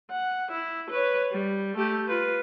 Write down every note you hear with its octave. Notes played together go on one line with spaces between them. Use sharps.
F#5
E4
B4 C#5
G3
A3 G4
F4 B4